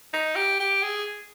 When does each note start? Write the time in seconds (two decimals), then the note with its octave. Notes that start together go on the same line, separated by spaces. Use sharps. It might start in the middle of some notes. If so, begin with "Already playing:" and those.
0.13 D#4
0.36 G4
0.60 G4
0.83 G#4